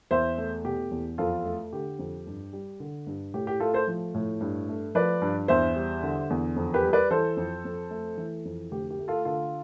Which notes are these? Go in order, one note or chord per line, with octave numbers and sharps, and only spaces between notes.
E2 C5 E5
A3
B2 G4
E2
F2 F4 A4
A3
D3 G4
F2
G2
G3
D3
G2
A2 G4
G4
A3 F4 A4
A4 C5
F3
A2
G2
A3
F3 B4 D5
G2
E2 C5 E5
G3
D3
E2
F2
G4 B4
G3
B4 D5
E3 A4 C5
F2
F2
A3
E3
F2
D2 G4
G4
A3
F4 A4
D3 F4 A4